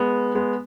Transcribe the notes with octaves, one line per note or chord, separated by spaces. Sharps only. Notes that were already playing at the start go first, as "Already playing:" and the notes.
Already playing: G#3 B3
G#3 B3